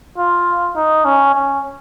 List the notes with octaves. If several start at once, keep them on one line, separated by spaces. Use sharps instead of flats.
F4
D#4
C#4
C#4